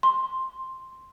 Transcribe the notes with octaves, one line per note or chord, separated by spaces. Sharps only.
C6